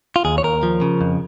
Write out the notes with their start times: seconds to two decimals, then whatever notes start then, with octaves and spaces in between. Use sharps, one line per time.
0.16 F4
0.25 D#2 G#4
0.38 C#5
0.43 D#2 A#4
0.63 F3
0.82 C#3
1.01 F2